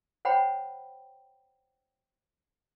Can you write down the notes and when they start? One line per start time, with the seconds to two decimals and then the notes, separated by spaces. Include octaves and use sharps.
0.25 C5 C#5 F#5 G5 B5